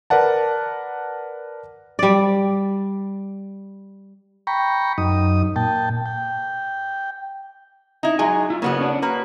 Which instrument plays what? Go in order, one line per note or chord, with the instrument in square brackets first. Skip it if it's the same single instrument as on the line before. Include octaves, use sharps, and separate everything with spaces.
[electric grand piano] A#4 B4 D5 F#5 A5
[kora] G3 D5
[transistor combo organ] G5 A#5 B5 C#6
F#2 D#4 D#6
A#2 G5 A5
G5
[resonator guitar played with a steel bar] D#4 E4
[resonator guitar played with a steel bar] F#3 G#3 D#4 [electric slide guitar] G#5
[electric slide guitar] E4 F4
[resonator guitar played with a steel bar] C#3 B3 F#5 [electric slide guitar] A#3 C#4 F#4
[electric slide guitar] C#4 D4
[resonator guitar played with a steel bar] A#3 B4 [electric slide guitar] F#4